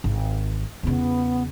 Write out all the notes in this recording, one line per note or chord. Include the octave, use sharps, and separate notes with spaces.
G#1
E2 C#3 B3